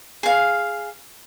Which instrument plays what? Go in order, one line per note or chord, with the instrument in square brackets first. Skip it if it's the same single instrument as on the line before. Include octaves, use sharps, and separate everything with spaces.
[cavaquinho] G#4 F5